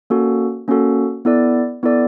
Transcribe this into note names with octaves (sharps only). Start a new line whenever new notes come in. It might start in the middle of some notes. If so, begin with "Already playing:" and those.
A#3 C#4 F#4 A4
A#3 C#4 F#4 A4
B3 E4 A4 D5
B3 E4 A4 D5